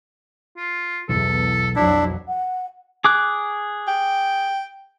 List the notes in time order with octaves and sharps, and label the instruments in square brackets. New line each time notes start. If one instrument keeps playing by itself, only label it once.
[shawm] F4
[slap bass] B1 E3 [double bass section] E2 [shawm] A4
[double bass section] B1 F2 F#3 [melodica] D4 [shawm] E4
[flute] F#5
[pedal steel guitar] G#4 D6 F#6
[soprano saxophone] G5